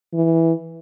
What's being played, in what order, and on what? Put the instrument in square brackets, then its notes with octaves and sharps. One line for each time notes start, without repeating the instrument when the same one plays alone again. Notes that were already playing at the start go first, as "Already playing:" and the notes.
[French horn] E3